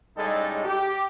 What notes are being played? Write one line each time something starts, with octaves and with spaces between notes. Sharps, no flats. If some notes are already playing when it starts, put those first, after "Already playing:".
A2 C#3 G3 G#3 D#4 A4
G4